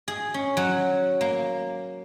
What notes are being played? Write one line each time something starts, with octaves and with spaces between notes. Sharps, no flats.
G#4
C#4
F#3
A#3